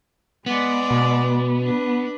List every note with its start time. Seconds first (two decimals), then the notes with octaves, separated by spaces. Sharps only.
0.46 G#3 B3 D5
0.91 B2
1.62 D4 B4